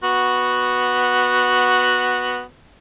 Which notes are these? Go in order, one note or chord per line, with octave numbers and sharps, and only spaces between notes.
B3 F#4